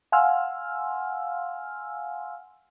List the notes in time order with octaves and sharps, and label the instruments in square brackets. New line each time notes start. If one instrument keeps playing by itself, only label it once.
[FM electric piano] F5 F#5 G#5 C6 E6 F6